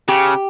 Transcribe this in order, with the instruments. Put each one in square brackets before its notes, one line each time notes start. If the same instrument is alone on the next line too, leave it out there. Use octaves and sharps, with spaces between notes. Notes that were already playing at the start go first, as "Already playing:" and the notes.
[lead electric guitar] C#3 [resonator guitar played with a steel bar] G4